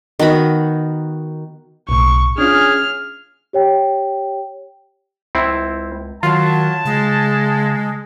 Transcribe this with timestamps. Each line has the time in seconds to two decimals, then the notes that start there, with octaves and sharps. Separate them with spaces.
0.19 D#3 B3 F#4 B5
1.89 B1 A2 C#6
2.38 C#4 D4 F4 G#4 F6
3.53 G4 C#5 G5
5.35 C#2 C4 E4
6.23 D#3 F#3 F4 A5
6.85 C#3 G#3